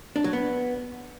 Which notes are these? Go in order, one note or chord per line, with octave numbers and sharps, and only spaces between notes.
D4
F#3
B3